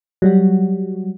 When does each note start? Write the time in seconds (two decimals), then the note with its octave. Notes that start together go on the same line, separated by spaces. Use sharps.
0.22 F#3 G3 F#4